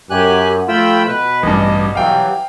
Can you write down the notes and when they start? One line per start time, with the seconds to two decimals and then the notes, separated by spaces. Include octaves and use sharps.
0.10 F#2 G4 G#5 F#6
0.69 F3 A3 F4 G5 B5 E6
1.08 B2 B4
1.43 A1 G2 D#5
1.95 E3 F#3 G3 F5 G5